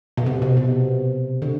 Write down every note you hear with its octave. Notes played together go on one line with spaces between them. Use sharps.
B2
C3
B2
C3
D3